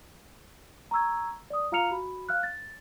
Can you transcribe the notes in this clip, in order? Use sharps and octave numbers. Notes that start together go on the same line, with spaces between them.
A#5 C#6 E6 G#6
D5 D#6
F4 F5 A#5 F6 C#7 F7
F#4 B5
F5 F6 F#6
A6